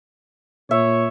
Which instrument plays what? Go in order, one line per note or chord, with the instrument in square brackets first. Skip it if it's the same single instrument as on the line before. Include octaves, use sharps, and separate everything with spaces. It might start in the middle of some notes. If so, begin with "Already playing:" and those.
[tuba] A#2 [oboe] C#5 [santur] E5